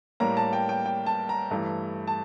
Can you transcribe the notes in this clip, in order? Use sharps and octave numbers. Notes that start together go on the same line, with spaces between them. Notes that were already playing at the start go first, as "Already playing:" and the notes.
A2 G3 A#3 A#5
A5
G5
G5
G5
A5
A#5
G2 E3 A3
A5